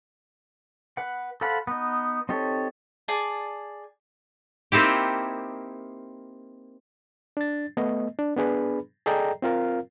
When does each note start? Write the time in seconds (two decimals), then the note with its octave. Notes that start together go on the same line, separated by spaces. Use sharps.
0.97 B4 F#5
1.41 A4 C5 F5 F#5 B5
1.67 B3 D#4
2.29 C4 D#4 G4 A4 C#5
3.08 G#4 D5 A5
4.72 A#3 C4 D#4 E4 G4
7.37 D4 A6
7.77 A3 B3 D#5
8.19 D4
8.37 B3 D4 G#4 B4 B5
9.06 G#4 A4 D5 D#5 G5 A#5
9.42 C4 F4 A#4 F5